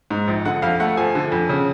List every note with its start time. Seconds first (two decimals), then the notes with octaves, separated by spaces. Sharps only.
0.10 G#2
0.28 A#1
0.45 D3 F#5
0.62 F2 F5
0.80 A3 F#5
0.97 F3 G#5
1.15 D3
1.32 F2
1.49 C#3